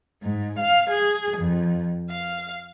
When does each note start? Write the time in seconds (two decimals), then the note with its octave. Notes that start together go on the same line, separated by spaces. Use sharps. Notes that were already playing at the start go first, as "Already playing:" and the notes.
0.22 G#2
0.59 F5
0.90 G#4
1.37 F2
2.10 F5